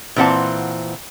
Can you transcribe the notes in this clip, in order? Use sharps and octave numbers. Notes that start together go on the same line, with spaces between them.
A#2 E3 C4 F#5 A5